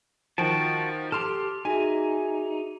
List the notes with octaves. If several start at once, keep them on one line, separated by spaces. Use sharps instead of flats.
D#3 F3 F#4 G5 A5
G4 A4 C6 F6
D#4 F#4 G#4 E5 G#5